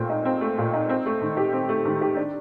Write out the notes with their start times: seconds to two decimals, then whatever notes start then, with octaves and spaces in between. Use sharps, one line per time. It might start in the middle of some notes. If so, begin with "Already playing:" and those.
Already playing: A#2 A3 C4
0.10 D#4
0.25 C4
0.41 A3
0.58 A#2
0.73 D#4
0.89 C4
1.06 A3
1.21 D#3
1.37 G4
1.53 C4
1.69 A3
1.85 D#3
2.01 G4
2.16 D4